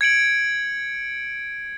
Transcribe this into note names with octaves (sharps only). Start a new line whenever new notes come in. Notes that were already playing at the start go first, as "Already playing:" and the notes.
G#6 C#7 D7 F#7